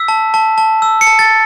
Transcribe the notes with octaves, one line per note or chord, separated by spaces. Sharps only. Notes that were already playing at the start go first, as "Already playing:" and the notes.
Already playing: E6 B6
A5
A5
A5
E6
C#7
A5
A6